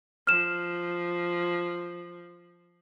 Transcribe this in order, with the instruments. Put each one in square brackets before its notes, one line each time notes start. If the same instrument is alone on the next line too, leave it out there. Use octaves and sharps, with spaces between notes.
[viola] F3 [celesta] F6 E7